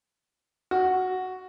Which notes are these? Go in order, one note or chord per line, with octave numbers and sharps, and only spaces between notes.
F#4